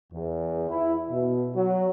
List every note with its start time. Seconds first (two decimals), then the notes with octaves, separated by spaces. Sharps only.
0.13 E2
0.71 E4
1.11 B2
1.56 F#3